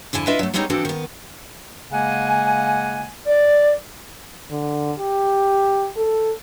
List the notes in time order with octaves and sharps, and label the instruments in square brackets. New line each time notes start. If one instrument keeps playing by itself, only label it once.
[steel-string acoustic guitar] F2 D3 E4 G#5 A5
D4 E4 F4 B4 D#5 E5
F#3 A3
G3 G#3 B3 C4 D#4 C#5
E3 F3 C4 D4 F#4 A4
D#3 B3
[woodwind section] C#3 G#3 A#3 F#5 G#5
D5
[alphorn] D3
G4
A4